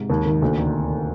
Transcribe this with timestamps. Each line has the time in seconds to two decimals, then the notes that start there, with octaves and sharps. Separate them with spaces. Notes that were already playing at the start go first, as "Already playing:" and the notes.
Already playing: G#2 C3
0.10 D#2
0.26 D#3
0.41 D2 A#2 D3
0.58 C3 D#3